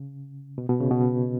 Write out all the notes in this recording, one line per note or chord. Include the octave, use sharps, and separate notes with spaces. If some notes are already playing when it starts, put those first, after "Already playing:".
Already playing: C#3
B2
B2
C#3
B2